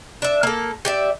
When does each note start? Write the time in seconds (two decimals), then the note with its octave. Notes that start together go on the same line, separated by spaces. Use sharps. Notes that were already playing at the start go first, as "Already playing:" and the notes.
0.22 D4 E5
0.43 A#3 A4
0.85 G4 D5 E5